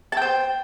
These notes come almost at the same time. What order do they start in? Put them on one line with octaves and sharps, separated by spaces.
A5 G5 C5